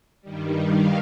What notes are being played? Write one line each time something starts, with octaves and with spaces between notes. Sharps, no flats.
G2 D#3 G3
F5